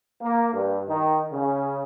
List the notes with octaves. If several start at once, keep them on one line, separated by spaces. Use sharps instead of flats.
A#3
G2
D#3
C#3